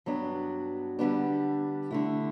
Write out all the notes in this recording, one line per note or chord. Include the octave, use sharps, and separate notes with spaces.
G2 F#3 B3 D4
D3 G3 B3 D4
D3 A3 E4